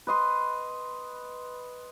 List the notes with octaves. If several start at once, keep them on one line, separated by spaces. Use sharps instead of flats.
B4 D#5 C6